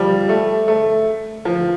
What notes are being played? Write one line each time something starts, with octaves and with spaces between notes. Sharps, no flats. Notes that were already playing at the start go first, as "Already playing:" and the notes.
Already playing: F3 G3
A3
A3
F3